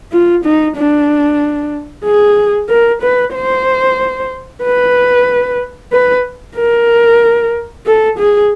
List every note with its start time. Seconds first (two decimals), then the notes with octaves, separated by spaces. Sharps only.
0.12 F4
0.44 D#4
0.77 D4
2.05 G#4
2.69 A#4
3.02 B4
3.35 C5
4.63 B4
5.92 B4
6.57 A#4
7.86 A4
8.18 G#4